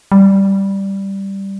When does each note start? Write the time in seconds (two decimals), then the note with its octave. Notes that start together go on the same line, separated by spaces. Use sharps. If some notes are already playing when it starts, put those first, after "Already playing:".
0.12 G3